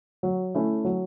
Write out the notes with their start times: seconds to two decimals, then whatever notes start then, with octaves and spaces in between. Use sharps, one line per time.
0.23 F#3
0.55 A3 C#4 E4
0.85 F#3